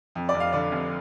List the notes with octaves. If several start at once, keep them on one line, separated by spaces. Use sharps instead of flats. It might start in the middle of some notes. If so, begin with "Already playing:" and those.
F2
D5
F1
F5
D3 D5
F1